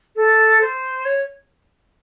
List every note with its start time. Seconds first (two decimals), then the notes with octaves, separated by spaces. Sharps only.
0.16 A4
0.61 C5
1.05 C#5